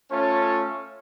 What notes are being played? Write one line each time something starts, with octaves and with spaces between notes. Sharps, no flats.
A3 C#4 F4 A4 C#5